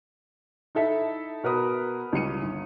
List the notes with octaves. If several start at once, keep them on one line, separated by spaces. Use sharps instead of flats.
D#4 E4 A4 E5
B2 A#4 B4 D#6
C#2 G3 C#7 D#7
G1